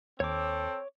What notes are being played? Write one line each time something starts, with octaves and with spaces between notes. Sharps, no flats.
D#2 C4 A4 C#5 D6